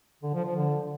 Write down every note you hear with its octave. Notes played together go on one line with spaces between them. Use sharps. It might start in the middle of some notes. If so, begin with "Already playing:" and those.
D3
F3
F3
D3